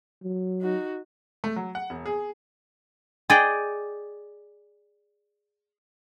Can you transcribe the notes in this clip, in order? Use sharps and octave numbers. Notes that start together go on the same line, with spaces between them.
F#3
D#4 F#4
A3
F#3
F#5
E1
G#4
G#4 D5 D#5 G5